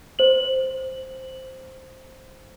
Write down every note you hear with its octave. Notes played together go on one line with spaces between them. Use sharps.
C5 F#7